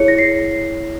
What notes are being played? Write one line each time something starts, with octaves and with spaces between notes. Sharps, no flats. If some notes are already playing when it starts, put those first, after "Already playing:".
Already playing: E4 G#4 C#5 C#7
A#6
C7